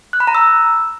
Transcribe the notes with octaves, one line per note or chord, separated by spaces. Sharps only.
F#6
B5
A#5
E6